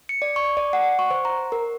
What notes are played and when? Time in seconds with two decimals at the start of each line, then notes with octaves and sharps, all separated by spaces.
0.09 C#7
0.22 D5
0.36 C#6
0.57 D5
0.73 F#5
0.99 C#6
1.11 C5
1.25 A#5
1.52 A#4